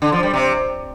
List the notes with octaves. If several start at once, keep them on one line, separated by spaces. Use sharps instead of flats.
D3
F3
G3
C3